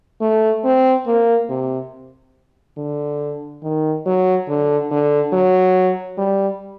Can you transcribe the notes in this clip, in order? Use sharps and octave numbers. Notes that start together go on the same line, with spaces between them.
A3
C4
A#3
C3
D3
D#3
F#3
D3
D3
F#3
G3